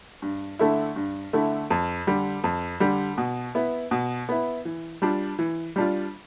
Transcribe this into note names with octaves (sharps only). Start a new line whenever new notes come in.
G2
D3 A3 E4
G2
D3 A3 E4
F2
D3 G3
F2
D3 G3
B2
B3 E4
B2
B3 E4
E3
G3 D4 F4
E3
G3 D4 F4